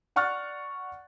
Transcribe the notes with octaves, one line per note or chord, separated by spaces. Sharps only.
D5 F#5 C#6 F6 F#6 A6